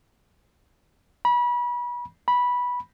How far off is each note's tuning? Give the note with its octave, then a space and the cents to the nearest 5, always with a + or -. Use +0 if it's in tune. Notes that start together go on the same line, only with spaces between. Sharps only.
B5 -30
B5 -10